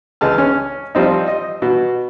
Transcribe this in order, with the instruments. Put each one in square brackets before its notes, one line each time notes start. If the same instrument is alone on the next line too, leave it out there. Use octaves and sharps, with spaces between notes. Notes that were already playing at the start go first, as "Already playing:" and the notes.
[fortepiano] C#2 E3 G#3 A5 F6
C#4 F6
F3 G3 C4 D#4
D#5
B2